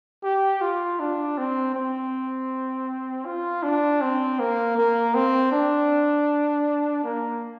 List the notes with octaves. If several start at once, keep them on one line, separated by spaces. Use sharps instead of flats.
G4
F4
D4
C4
C4
F4
D4
C4
A#3
A#3
C4
D4
A#3